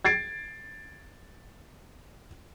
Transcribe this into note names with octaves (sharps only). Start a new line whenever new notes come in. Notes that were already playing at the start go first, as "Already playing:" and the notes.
G#6 A6 C7 D7